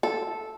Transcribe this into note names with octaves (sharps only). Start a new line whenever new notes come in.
A4